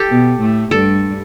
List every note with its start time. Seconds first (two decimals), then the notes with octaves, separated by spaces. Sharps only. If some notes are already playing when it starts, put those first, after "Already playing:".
Already playing: G4 A4
0.09 B2 B3
0.39 A2 A3
0.71 G2 G3 A4